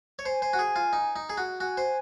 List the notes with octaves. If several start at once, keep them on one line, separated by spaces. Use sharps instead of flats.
C#5
C5 G#5
C5
F#4
G#4
F4
D#4
D#4
G#4
F#4
F#4 G#5
C5